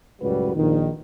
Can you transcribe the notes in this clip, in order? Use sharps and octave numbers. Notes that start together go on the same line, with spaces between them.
C#2 F#2 A2 G3 F#4 B4
A#1 F2 D#3